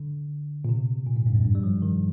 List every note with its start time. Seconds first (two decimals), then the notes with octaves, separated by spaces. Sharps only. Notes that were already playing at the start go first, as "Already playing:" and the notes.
Already playing: D3
0.65 A#2
0.69 C3
1.06 A#2
1.16 G#2
1.26 G2
1.35 F2
1.45 G2
1.55 G3
1.63 F3
1.82 D#3